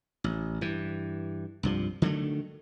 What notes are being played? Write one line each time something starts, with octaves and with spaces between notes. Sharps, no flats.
A1
G2 E3
C2 G2 F3
D3 D#3 F#3 A3